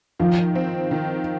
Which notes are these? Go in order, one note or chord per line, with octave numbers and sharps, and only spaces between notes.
D#3 F3
C4
D#3